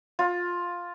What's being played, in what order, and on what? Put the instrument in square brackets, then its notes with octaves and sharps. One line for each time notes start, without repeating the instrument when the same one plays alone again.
[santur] F4